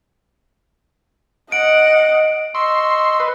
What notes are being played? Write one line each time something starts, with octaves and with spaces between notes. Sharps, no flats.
D#5 F#5 D7
D#5 C6 C#6 E6
B4